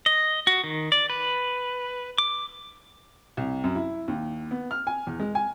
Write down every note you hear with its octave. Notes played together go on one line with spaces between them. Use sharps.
D#5
F#4
D#3
D5
B4
D6
C2
F#2
E4
D#2
B3
F6
G#5
E2
G#3
G#5